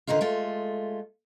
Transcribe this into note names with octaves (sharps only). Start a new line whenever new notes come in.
D3 D#3 C#4 D#4 F4
G#3 A3 F4